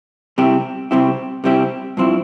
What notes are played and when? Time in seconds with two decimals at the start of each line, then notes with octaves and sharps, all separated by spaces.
0.38 C3 G3 C4 E4 G4
0.91 C3 G3 C4 E4 G4
1.44 C3 G3 C4 E4 G4
1.97 G2 F3 C4 E4